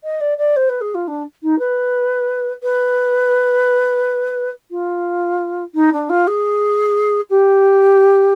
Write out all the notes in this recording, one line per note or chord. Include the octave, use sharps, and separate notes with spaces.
D#5
D5
D5
C5
B4
G#4
F4
D4
D#4
B4
B4
F4
D#4
D4
F4
G#4
G4